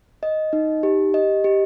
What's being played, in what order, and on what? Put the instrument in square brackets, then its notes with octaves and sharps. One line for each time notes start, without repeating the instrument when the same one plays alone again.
[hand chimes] D#5
D#4
G4
D#5
G4